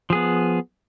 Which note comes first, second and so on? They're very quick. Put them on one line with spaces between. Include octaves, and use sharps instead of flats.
F3 G#4 B3